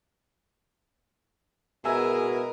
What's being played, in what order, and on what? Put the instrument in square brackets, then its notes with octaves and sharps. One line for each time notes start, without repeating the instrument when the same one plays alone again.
[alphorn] B2 [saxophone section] G#3 E4 G#4 [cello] A#4 [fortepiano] E5 G#5 E6